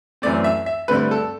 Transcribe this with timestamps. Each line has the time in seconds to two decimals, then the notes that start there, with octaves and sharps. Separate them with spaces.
0.22 F#2 E3 A3 C4 D5
0.44 E5
0.66 E5
0.88 G2 D3 A3 C4 B4
1.11 A4